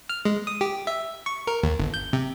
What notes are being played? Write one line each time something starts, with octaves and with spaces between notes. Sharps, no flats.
F6
G#3
D#6
G4
E5
C#6
A#4
D#2
G1
G6
C3